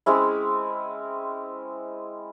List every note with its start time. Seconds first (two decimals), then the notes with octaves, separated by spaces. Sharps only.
0.06 G#3 C4 C#4 E4